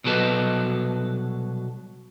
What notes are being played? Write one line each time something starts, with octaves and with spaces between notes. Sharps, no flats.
C2 B2 F#3 A4 B4 D#5